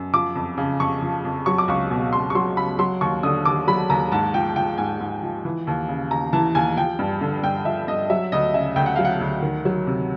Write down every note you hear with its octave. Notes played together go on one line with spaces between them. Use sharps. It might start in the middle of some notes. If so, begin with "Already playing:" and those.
Already playing: F#2
F3 D6
F2
C#3
F2 C#6
F3
F2
F#3 C#6
D6
C#2 C#6
B2
C#2 C6
C#6
F#3 C6
C#2 B5
F#3 C6
D#2 C#6
D3 D#6
D#2 D6
F#3 B5
D#2 A#5
G#2 A5
F3 G5
F3 G5
G#2 G#5
G#2
F3
E3
D#2
C#3
D#2 A#5
E3 A5
D#2 G#5
F3 G5
G2
D3
G2 G5
F3 E5
G2 D#5
F#3 E5
D2 D#5
C#3 E5
D2 G5
F#5
F#3 F5
F#5
D2
D#3
F#3
C3